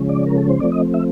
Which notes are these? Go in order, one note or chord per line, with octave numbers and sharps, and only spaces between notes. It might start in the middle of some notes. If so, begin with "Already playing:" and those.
Already playing: C#3 F3 G#3 C#4
D5
A#4
A4
C5
F3 A3 C4 D5
D#5
E5